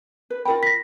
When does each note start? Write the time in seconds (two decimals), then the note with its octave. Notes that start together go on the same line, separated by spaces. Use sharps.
0.30 B4
0.45 F4 A#4 G5 B5
0.63 A#6 B6